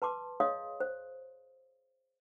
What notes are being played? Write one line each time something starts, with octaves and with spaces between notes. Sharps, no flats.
B4 A5 C6 D6
G#4 C#5 D#5 F5 C6 D#6
C5